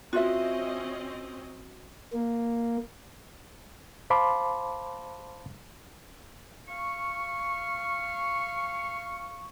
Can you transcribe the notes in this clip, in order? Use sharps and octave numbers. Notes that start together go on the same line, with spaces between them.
C4 C#4 F4 F#4 D#5 E5
A#3
C5 F5 A5 B5 C6 D6
F5 C#6